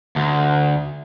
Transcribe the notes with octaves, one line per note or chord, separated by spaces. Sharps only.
D2